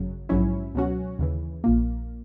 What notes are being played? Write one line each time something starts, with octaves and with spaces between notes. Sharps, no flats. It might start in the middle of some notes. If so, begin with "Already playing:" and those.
Already playing: G#1 F#2 C#3 F#3
A#1 G#2 F#3 C#4 E4
C#2 B2 F#3 C#4 F#4
D#2 C#3 E3
A#1 A#2 A#3